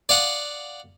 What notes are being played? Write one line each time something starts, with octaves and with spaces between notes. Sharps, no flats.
D5 F5 F#5 D#6